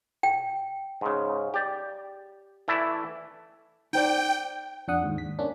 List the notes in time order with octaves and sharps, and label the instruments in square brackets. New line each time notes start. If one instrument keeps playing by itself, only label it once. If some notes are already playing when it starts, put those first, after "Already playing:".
[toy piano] G5
[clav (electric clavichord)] G#2 C#3
G4 D5
E3 A3 E4 D5 E5
[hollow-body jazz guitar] D#4 C5 D5 [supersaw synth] G5
[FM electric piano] F2 D4 F#5 D#6
D#2 G#2
B6
A#3 C#4 D4